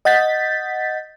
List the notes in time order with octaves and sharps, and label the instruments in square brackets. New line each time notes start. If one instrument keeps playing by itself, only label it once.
[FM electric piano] D#5 F#5 G6 A6 B6